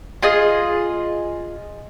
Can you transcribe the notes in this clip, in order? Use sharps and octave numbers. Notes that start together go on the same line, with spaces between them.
F4 G#4 D#5